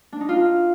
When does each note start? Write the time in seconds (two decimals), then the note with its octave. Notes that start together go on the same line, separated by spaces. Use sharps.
0.12 D4
0.21 D#4
0.29 F4